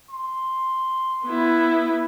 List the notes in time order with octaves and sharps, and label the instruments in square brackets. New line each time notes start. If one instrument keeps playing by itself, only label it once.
[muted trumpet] C6
[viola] B3 E4